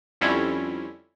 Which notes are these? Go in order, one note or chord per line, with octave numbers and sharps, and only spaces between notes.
F2 D3 G3 C4 C#4 E4